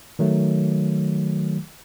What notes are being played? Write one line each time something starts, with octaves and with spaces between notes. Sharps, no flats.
D#3 F#3 A3